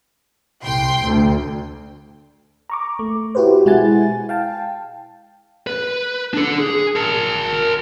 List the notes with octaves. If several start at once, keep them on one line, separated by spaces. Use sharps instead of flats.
C2 G5 C6
D2
A#5 C#6 D6
A3
E4 F#4 G4 B4 C5
B2 G#3 E4 F#5 G#5 A6
F5 G5 A5
B4
D4 A4
G#4
A#4 A5